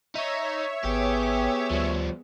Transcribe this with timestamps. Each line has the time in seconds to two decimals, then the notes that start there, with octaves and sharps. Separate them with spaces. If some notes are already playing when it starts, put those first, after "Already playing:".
0.15 D#4 C#5 E5
0.84 G#1 B3 G4 G#4
1.70 D2 F3 G3